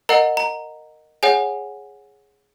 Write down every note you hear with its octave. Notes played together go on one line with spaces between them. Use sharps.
A#4 D#5 F#5 A#5
A#5
G#4 C#5 F#5 G#5